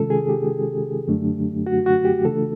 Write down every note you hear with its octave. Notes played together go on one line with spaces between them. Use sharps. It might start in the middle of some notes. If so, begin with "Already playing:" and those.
Already playing: C3 D#3 G#3 C#4 F4 A4
G#4
G4
F#2 D3 F#3 A3 D4
F#4
F#4
G4
C#3 E3 A3 D4 F4 A4